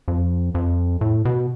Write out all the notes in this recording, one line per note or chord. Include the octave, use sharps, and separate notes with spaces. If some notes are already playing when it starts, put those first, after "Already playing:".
F2
F2
A2
B2